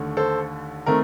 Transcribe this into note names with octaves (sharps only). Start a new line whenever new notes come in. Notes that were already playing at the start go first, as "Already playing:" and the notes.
Already playing: D#2 D3 A3
A4 C5
D#3 A3 C4 A#4